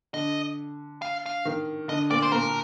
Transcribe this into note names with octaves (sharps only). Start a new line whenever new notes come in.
D3 D#5
F5
F5
D#3
D3 D#5
A#2 D5
C5
A#2 A#4